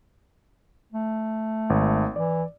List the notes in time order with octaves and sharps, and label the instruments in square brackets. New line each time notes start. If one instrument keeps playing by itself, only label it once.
[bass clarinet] A3
[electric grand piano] G#1
[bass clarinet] E3 [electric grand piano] D5